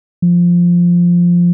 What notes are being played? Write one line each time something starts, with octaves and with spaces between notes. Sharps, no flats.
F3